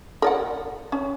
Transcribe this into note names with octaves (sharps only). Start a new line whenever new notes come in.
A#4 D5 F#5
C#4